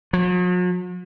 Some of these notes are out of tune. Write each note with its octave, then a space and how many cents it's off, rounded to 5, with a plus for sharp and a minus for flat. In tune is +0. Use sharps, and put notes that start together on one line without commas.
F#3 -45